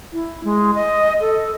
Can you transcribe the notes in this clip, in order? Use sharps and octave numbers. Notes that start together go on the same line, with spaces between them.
E4
G#3
D#5
A4